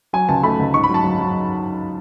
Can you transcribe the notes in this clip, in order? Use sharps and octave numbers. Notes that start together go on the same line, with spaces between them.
F#3 G#5
C#2 A5
A3 B5
C#2
G#2 C#6
B5
F#3
A5
F#3
F#3